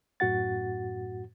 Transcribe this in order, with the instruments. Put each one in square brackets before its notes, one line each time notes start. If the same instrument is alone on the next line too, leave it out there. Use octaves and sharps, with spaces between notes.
[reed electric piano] F#2 A2 F#4 F#5 A6